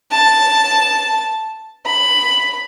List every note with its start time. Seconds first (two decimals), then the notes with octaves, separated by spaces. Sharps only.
0.12 A5
1.86 B5